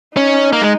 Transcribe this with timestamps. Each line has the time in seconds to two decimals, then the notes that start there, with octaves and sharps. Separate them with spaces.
0.17 C#4 D#4
0.53 A#3
0.62 G#3